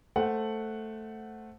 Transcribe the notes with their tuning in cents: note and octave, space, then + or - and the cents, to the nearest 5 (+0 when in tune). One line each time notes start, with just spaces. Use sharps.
A3 +0 C5 +0 F#5 +0